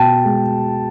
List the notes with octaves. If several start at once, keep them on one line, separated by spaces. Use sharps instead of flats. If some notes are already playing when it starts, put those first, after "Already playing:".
Already playing: B2 G5 A5
G#3